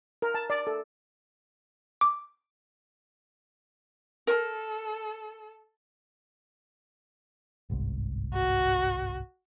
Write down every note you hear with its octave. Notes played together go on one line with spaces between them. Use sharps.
A#4
A5
D5
A4
D6
A4 A#4
G1 C2 G#2
F#4